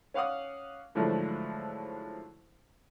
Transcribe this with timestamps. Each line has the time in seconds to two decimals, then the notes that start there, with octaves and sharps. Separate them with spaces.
0.14 C#4 F5 F#5 D6 D#6
0.95 G#2 D3 F3 F#3 A3 E4